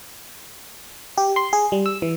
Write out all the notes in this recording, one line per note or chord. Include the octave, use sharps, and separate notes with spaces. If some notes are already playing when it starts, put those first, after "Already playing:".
G4
C6
G#4
G3
E6
E3